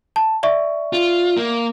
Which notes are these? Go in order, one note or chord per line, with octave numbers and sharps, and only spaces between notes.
A5
D5 E5 C#6
F4
A#3